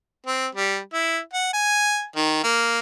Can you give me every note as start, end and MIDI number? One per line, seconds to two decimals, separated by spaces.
0.26 0.47 60
0.55 0.79 55
0.93 1.19 64
1.33 1.50 78
1.53 2.05 80
2.16 2.39 51
2.43 2.79 58